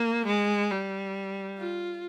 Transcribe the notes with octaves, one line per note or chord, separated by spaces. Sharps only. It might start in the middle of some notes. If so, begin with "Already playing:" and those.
Already playing: A#3
G#3
G3
F4